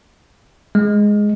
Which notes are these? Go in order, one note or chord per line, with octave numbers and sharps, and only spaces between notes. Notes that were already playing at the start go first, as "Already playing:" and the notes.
G#3